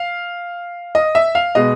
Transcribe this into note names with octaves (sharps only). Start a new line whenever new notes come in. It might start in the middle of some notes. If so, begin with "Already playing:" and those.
Already playing: F5
D#5
E5
F5
B2 G#3 D#5